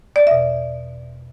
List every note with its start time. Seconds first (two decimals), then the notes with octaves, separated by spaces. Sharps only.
0.16 D5
0.27 E2 B2 E5